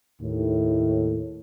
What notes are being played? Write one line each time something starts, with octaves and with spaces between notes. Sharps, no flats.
D#2 A2